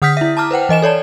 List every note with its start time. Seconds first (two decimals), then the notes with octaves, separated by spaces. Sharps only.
0.02 D3 F#5 D#6 F6 G6 B6
0.17 E4 E5
0.37 A5 A#5 D6 F6
0.51 B4 C5 F#5 G5
0.69 E3 D#5 G#5 E7
0.82 A4 C#5 D5 A5